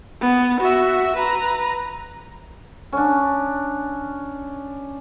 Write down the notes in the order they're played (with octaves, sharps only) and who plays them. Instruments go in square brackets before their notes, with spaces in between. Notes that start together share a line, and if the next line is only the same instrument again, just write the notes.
[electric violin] B3
F#4 E5
B4 A#5
[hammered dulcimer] C#4 D4